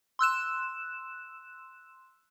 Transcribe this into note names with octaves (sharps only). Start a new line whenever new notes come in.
C6 E6 F#6 E7